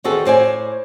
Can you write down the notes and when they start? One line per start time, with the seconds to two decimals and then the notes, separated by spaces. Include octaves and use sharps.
0.04 E2 D#3 C4 F#4 G#4 A4
0.25 A2 C5 D5 G#5